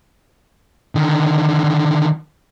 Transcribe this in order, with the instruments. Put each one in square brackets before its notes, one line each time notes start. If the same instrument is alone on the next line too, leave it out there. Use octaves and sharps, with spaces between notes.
[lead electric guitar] D3 D#3